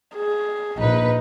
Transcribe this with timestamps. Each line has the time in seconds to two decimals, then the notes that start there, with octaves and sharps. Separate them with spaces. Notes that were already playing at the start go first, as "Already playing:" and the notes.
0.15 G#4
0.80 A#1 D#4 B4